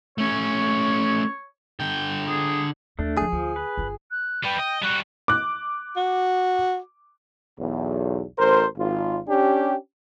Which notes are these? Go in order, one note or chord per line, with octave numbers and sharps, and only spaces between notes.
A3 C#4 C#5
D3 G5
G#4
D#2 A3 D4
D2 F3 G#4
D2 F3
B4
G1 F4
F#6
G3 B4 G5
D#5
G3 F#4 F#6
D6 F#6
F#4
B1 E2
A1 A#4 C5
G#1 F4
C#4 D4 G4